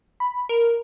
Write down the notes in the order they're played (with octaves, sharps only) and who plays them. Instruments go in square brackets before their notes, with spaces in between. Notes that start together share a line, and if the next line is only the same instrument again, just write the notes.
[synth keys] B5
A#4